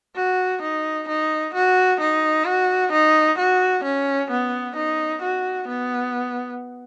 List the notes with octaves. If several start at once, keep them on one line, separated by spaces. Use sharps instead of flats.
F#4
D#4
D#4
F#4
D#4
F#4
D#4
F#4
C#4
B3
D#4
F#4
B3